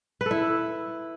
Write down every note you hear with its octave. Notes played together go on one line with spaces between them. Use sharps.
B4
A4
E4